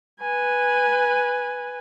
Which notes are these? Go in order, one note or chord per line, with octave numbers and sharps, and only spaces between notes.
B4 G#5